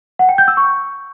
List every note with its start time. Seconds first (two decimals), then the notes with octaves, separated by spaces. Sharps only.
0.19 F#5
0.29 G5
0.38 G6
0.48 E6
0.57 C#6